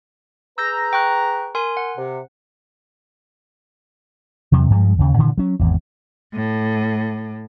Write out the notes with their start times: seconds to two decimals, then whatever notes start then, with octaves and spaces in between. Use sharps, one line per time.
0.58 G#4 B4 A#5 E6 G6 A#6
0.93 G5 C#6 F#6
1.55 A#4 G#5 C6
1.77 F#5
1.97 C3
4.52 E2 C3 F#3
4.70 G2 F3 G#3
4.99 D#2 C#3
5.17 G2 A#2 D3 E3
5.38 F#3 C#4
5.59 G#1 E2
6.33 A2